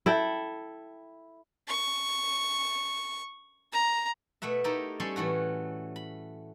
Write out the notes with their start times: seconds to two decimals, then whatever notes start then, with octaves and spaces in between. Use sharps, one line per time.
0.06 E4 A4 G5
1.68 C#6
3.73 A#5
4.42 B2 A3 B4 E5
4.64 A3 D#4 E4 G4 A4 A#4
5.00 G3 C#4 A4 C6
5.16 A2 E3 A3 F#4
5.96 B5